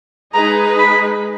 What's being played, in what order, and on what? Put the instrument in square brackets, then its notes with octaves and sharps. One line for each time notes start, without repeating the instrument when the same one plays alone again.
[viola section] G#3 D#4 G#4 B4 D#5 [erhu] A#5
[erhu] B5